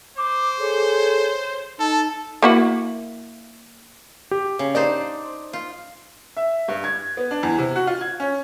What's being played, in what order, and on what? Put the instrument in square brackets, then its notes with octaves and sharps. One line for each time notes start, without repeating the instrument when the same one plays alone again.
[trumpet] C5 [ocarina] D6
[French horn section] G#4 A4 [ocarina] C#5
[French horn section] D#4 [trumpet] A4 [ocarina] A5
[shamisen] A#3 E4 F#4
[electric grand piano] G4
[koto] C#3
[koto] D4 D#4 C5 [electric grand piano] D5
[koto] F4
[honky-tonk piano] E5
G2
G#6
B3
D4
E2
C3
F#4
F4
G#6
C#4